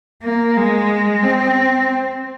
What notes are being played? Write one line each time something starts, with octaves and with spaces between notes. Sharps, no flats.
A#3
G#3
C4